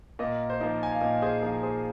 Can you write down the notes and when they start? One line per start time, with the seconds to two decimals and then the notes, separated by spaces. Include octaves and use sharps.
0.19 A#2 A#4 D#5
0.50 C5
0.60 F3 A#3 D#4 A#4
0.83 G#5
0.92 F5
1.01 A#2 A#4 D#5
1.22 G#4 C5
1.41 F3 A#3 D#4 A#4
1.63 G#4 C5